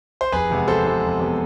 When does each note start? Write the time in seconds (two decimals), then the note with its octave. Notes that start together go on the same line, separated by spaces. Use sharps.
0.21 C5
0.32 F1 G#4 B4
0.50 E2 C3 G#3 B3
0.68 F1 A4 C5
0.85 E2 C3 G#3 B3
1.03 F1
1.20 E2 C3 G#3 B3